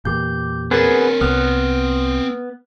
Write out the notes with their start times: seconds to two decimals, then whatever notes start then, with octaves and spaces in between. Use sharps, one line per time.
0.05 E2 A#2 G4 G6
0.71 B3 C4 G#4 A#4 B4 C#5 A6
1.21 C2 B3 F6